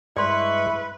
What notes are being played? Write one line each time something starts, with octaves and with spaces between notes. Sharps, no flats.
G2 G#3 E4 B4 D5 C6 C#6